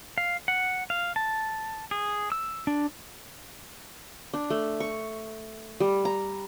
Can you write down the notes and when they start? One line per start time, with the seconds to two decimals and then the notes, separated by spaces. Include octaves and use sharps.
0.18 F5
0.48 F#5
0.90 F5
1.16 A5
1.91 G#4
2.32 E6
2.67 D4
4.34 D4
4.50 A3
4.80 C#6
5.80 G3
6.05 A#5